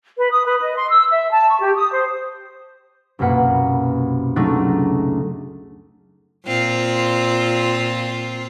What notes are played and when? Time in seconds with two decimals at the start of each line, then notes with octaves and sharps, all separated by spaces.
0.18 B4
0.31 D#6
0.44 B4
0.60 D#5
0.75 C6
0.90 E6
1.10 E5
1.31 A5
1.49 C#6
1.60 G4
1.77 D#6
1.92 C5
3.19 C2 F#2 B2 A#3 B4 F#5
4.36 C#2 F#3 A3 D4 D#4 F#6
6.46 A#2 C4 F4